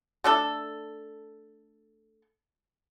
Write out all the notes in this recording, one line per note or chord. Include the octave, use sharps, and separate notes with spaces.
A3 D4 A4